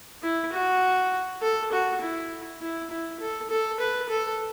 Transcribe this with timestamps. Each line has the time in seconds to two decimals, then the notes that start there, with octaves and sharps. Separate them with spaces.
0.23 E4
0.53 F#4
1.42 A4
1.72 F#4
2.02 E4
2.61 E4
2.90 E4
3.20 A4
3.50 A4
3.80 B4
4.09 A4